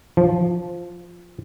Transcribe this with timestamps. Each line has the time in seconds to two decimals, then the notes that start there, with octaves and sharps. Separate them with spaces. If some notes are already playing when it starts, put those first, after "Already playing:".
0.17 F3